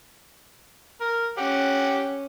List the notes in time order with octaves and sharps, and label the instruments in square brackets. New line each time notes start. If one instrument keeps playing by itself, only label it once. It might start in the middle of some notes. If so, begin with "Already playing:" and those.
[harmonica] A#4
[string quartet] C#4 [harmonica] G4 F#5